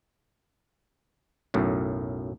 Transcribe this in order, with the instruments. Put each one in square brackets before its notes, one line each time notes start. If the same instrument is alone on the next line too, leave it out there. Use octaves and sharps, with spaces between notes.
[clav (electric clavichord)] B1 F#2 A2